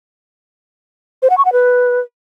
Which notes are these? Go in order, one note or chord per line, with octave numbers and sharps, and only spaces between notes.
C5
F#5
C#6
F#5
B4